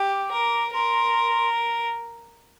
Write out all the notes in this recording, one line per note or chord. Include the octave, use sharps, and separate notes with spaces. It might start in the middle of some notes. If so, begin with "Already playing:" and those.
Already playing: G4 D6
A#4
A#4 C6